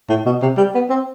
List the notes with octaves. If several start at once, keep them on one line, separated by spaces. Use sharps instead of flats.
A2
B2
C3
G3
B3
C4